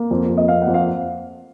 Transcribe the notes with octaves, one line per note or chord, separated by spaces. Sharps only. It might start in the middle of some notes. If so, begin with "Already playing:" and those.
Already playing: A#3
F2
F2
D#5
A#3 F5
F#5
F2
F5